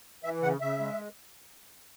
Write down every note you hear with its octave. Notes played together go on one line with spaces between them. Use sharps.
E3 E5
C#3 F#5
C#3 E5
G#3